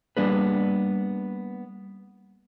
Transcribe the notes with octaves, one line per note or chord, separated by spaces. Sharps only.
G3 A#3 B3 D4 G#4 B4